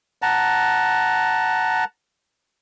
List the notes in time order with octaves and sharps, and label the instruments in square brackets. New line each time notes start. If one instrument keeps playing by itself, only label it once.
[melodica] F#5 A5 A#5